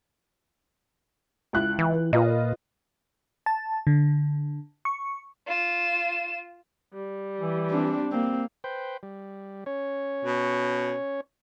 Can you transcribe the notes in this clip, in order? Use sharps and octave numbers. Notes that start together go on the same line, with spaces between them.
C#2 E4 F#6
E3
A#2 F4 B4 D#5
A5
D3
C#6
F4 E7
G3
E3
C4 D4
A#3 C4
B4 C5 G5
G3
C#4 C#5
B2